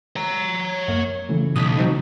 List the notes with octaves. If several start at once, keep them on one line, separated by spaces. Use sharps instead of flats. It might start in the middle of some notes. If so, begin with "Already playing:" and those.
C#5 A#5
F#2 A#3
C#3 E3 A3
B1 D#6 B6
F#3 C4 D#4